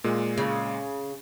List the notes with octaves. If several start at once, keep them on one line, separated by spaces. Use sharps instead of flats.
A#2 G#3
C#3